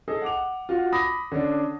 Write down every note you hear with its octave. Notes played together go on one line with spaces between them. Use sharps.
G#4 A4 D#5
F#5 D6 F7
F4 F#4
B5 D6 D#6 A#6
D3 C#4 D4